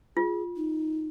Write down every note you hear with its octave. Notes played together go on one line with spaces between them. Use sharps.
F4 G#4
D#4